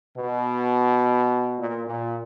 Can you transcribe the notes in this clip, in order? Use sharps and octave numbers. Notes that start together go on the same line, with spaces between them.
B2
A#2
A#2